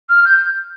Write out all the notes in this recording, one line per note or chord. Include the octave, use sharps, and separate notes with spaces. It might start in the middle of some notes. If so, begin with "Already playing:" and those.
F6
G6